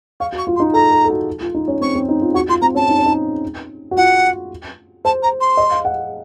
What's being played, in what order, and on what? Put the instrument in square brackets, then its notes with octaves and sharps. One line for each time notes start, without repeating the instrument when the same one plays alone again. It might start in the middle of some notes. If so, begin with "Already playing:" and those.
[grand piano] F5 [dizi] C#6
[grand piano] F#4
[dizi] C#6
[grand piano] F4
[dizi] C6
[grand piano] D#4
[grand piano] A4 [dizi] A#5
[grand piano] A4
A4
F#4
F4
D#4
C#4
[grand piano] C4 [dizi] C#6
[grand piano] C4
D#4
F4
[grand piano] F#4 [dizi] C#6
[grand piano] F4 [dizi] C6
[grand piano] C4 [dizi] A#5
[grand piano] C#4 [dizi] A5
[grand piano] D#4
C#4
D#4
F#4
[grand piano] F4 [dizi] F#5
[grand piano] C5 [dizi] A5
[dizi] A#5
C6
[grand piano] D#5
F5
F#5